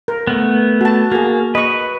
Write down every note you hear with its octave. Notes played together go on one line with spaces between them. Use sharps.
A#4
A3 B3
F#4 A5
A#3 F#4 G#4
B4 D#5 C#6